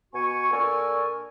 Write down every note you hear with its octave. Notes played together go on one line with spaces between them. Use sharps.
B2 B3 F#4 G#5 C#6
A#2 D4 A4 A#4 G#5 C#6